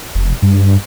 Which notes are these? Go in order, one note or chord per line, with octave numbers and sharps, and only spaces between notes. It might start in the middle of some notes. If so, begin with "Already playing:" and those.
F1
G2